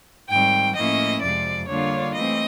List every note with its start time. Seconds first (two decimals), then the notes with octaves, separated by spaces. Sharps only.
0.29 G#2 D#3 G3 C4 G5
0.75 A2 F3 A#3 C#4 E4 D#5
1.21 F2 C3 F3 G#3 D5
1.68 D3 G3 A#3 D4 F4 C#5
2.13 E3 A3 C4 D#5